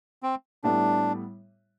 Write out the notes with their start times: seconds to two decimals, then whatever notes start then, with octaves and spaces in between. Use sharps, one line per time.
0.23 C4
0.64 A2 G3 B3 D4 E4